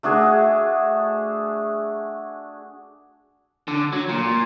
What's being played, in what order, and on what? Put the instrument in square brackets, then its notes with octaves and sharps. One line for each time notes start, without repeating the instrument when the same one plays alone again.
[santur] A3 D4 F#4 G#4
[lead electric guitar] D3
F#3
A#2